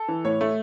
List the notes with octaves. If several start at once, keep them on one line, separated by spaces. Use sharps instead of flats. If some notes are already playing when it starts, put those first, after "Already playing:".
Already playing: A4
E3
A2 C#5
A3